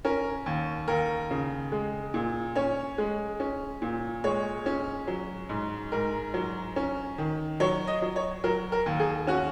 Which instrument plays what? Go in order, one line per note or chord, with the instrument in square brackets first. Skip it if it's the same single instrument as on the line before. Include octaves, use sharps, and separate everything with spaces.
[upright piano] C#4 A#4
D#2
D#2 A#4
C#3
G#3
A#2
C#4 C#5
G#3
C#4
A#2
G#3 C#5
C#4
F#3
G#2
G#2 A#4
F#3
C#4
D#3
F#3 C#5
D#5
F#3
C#5
F#3 A#4
A#4
D#2
G#4
C#4 F#4